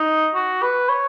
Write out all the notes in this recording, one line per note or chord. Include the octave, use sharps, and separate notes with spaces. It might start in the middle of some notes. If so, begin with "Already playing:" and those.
Already playing: D#4
F#4
B4
C#5